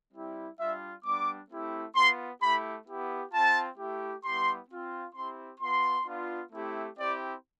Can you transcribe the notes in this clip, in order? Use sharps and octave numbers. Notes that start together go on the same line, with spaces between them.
G3 C4 E4 G4
G3 D4 F4 E5
G3 B3 D4 D6
A3 C4 E4 G4
B3 F4 C6
A3 E4 G4 B5
B3 E4 G4
C4 F4 A5
A3 E4 G4
G3 B3 E4 G4 C6
C4 F4
C4 E4 G4 C6
B3 F4 C6
B3 D4 F4
A3 C4 E4 G4
C4 E4 G4 D5